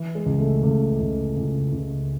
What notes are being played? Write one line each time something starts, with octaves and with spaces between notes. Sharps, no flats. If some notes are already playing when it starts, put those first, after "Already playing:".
Already playing: E3
G#3
C#2
A3
C#2 A3
C#2
C#2
C#2